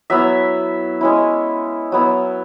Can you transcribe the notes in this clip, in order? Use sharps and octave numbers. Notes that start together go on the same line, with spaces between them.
F#3 B3 E4 E5
G#3 C#4 E4
F#3 B3 E4